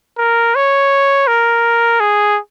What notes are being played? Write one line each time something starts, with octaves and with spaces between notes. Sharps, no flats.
A#4
C#5
A#4
G#4